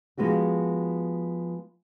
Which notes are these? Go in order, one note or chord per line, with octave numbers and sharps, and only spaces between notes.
F3 G#3 B3 F#4 G4